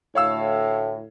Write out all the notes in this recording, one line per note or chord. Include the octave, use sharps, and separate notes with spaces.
D2 A2 C#5 F5 E6